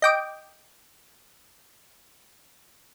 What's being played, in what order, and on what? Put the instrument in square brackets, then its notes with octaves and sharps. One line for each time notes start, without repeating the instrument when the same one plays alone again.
[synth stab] D#5 G5 D6